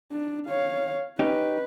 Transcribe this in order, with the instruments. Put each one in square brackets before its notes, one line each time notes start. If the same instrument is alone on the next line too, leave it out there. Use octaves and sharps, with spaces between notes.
[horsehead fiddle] D4
C#5 F5
[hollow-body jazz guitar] C#4 D#4 G4 [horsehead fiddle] B4